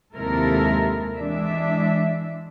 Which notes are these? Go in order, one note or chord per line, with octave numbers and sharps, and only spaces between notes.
D#2 C3 G#3 E4 A4 A#4
E3 G#3 D4 E5